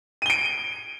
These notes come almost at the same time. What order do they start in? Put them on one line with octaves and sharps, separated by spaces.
D#7 G7 D7